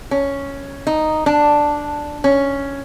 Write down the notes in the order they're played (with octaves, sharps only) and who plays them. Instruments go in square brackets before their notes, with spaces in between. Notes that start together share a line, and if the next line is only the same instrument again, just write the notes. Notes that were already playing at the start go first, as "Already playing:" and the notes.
[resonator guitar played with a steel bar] C#4
D#4
D4
C#4